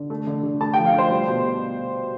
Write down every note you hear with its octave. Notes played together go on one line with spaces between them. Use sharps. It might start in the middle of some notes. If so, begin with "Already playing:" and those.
Already playing: D3
A3
D3
D3
A3 A5
G5
F3
F5
A3 C5
G3
B2
B2